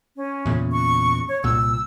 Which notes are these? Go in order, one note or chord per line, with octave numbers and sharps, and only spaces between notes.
C#4
E2 A#2 C#3
C#6
C#5
C2 A#2 E6